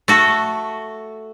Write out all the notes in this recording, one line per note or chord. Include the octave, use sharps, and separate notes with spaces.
A3 F#4 A4